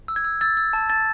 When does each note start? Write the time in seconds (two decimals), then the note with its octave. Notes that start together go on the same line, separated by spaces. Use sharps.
0.08 E6
0.16 G#6
0.24 E6
0.41 E6 A6
0.57 E6
0.73 A5
0.90 A5 A6